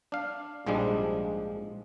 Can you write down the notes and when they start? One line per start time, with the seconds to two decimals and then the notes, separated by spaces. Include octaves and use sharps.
0.12 D4 F5
0.66 A#1 G#2 F3 G3 G#3 D4